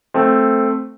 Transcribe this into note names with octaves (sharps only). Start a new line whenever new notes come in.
A3 C4